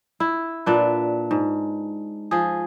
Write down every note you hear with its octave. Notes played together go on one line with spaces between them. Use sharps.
E4
A#2 D4 B4
G#2
F3 G#4